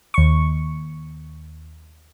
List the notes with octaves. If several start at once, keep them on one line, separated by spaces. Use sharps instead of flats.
D#2 C#6